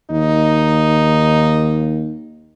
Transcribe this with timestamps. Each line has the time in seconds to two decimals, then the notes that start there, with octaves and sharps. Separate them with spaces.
0.10 D#2 D#4